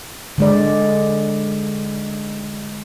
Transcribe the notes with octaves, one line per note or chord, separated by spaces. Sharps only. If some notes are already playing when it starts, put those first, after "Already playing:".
D3 G#3 D5